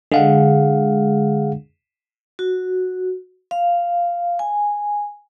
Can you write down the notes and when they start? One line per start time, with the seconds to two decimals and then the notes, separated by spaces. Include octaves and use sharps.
0.12 D3 G#3 G#4 F5 F#5
2.39 F#4
3.51 F5
4.39 G#5